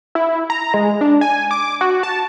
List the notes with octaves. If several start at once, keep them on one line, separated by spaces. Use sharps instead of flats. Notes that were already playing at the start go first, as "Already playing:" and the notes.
E4
A#5
G#3
D4
G#5
D6
F#4
A5